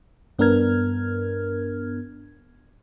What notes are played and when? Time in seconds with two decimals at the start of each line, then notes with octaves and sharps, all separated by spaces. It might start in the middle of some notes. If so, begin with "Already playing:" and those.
0.39 G2 B3 D4 A#4 F6 G#6